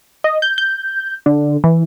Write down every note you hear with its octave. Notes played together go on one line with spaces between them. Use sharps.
D#5
G6
G6
D3
E3